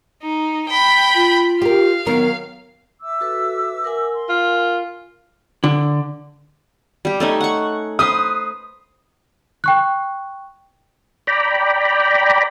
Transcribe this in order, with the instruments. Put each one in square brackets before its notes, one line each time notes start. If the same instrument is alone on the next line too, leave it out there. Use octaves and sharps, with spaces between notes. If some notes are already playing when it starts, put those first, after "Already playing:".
[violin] D#4
G5 B5
[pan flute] F4
[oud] G4 A#4 [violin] F5
[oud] D#3 F#3 A#4 [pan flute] B3
[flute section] E5 D6 E6
[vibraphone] F#4 A4 B4
A#4 F#5 G#5
[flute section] C6
[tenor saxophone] F4
[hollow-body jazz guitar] D3
[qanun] G3 G4
A3 C#4 D#4
F#5 C#6
[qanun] B4 C5 C6 [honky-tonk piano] D#6
[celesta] G5 C#6 F#6
[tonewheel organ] D5 G5 A#5 B5